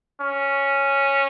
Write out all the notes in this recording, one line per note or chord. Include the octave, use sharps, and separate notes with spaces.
C#4